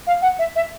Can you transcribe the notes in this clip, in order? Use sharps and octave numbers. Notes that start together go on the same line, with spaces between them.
F5
F#5
E5
E5